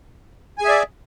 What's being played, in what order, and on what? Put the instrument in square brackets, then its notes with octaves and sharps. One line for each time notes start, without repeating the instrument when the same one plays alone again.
[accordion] G#5
G#4
E5
D5